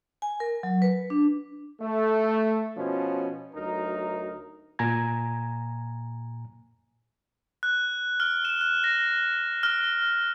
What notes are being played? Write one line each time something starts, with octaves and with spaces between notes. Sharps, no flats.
G#5
A#4
F#3
B4
D4
A3
B2 F3 C#4
D2 F#3 D#4 A#4
A#2 G#5 A#5 G#6
F#6
F6
E7
F#6
A#6
F6